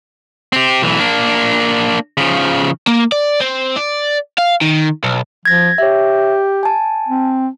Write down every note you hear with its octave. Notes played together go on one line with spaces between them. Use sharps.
C4 G4
B1 E3
A#3 D4
C#3 F3
A#3
D5
C4
D5
F5
D#3
B1
F3 G#6 A#6
G4 C#5 E5
G#5 A5
C4